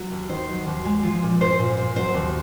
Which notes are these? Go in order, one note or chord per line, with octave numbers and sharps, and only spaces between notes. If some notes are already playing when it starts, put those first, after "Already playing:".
Already playing: F#3
D#2
D#3 C5
F#3
D#2
G#3
F3
A#2
A#2 C5
A#2
A#2
F#3 C5
D#2